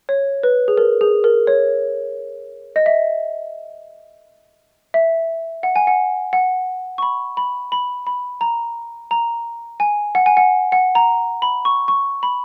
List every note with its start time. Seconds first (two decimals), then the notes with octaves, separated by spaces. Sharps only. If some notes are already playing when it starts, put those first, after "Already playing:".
0.09 C#5
0.43 B4
0.68 G#4
0.77 A#4
1.01 G#4
1.24 A#4
1.47 C#5
2.76 D#5
2.86 E5
4.94 E5
5.63 F#5
5.76 G#5
5.87 F#5
6.33 F#5
6.98 C#6
7.02 B5
7.37 B5
7.72 B5
8.07 B5
8.41 A#5
9.11 A#5
9.80 G#5
10.15 F#5
10.26 G#5
10.37 F#5
10.72 F#5
10.95 A#5
11.42 B5
11.65 C#6
11.88 C#6
12.23 B5